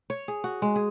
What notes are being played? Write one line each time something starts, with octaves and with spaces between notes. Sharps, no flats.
C#5
G#4
F#4
G#3
G#4